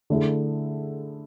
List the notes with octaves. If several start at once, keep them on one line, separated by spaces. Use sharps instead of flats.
D3 A3 E4 G#4